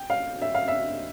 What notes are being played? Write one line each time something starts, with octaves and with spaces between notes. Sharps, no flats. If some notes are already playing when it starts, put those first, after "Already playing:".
Already playing: G5
F5
E5
F5
E5